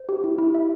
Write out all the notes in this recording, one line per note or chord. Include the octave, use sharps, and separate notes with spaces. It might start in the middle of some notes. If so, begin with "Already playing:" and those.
Already playing: C5
G4
E4
E4
E5